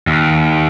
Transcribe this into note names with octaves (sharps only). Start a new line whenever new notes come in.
D#2